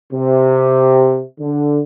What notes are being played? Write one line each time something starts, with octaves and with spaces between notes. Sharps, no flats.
C3
D3